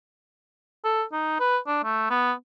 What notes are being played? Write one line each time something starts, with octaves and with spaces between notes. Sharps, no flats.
A4
D#4
B4
D4
A3
B3